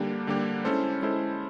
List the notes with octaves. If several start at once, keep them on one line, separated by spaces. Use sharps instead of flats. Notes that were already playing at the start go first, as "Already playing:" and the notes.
Already playing: D3 G3 A#3 D4 G4
D3 G3 A#3 D4 G4
G#3 C#4 E4 A4 C5
G#3 C#4 E4 A4 C5